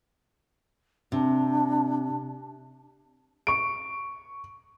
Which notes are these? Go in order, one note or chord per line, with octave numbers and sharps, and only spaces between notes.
C3 D4
C#6 D7